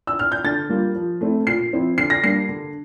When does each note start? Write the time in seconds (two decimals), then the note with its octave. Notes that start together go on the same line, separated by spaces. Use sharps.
0.07 E6
0.19 F6
0.32 G6
0.44 D3 A6
0.70 G3 A#3 F4
0.96 F3
1.21 A3 C4 E4
1.47 A#2 C7
1.73 F3 C4 E4
1.98 D3 C7
2.10 A#6
2.23 G3 A#3 D4 C7
2.49 D3